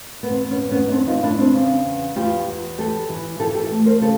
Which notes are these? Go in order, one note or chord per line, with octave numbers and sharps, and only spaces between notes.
B3
E2 C4
B3 C#4
E2
B3 C#4
D#4
E2 C4 D4
D#4 F4
E2 D4 E4
C4 D4
C#3
E2
E2 F4 G4
E2
E3 G4 A4
E3
E3 G4 A4
G4 A4
A3
A#4 C5
C#3 G4 A4